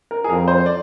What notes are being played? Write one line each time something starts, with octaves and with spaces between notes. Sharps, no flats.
A#4
G#4
F2 A#4
C5
D5